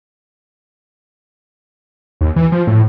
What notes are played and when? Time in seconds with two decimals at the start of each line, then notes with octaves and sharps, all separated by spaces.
2.21 D#2
2.36 E3
2.52 F3
2.67 A2